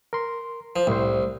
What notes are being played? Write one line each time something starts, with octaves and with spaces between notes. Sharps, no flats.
A#4 C6
F3
C2 A2 C5